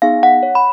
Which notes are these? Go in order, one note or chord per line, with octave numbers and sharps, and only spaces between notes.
B3 D#4 G#4 F5
F#5
C#5
B5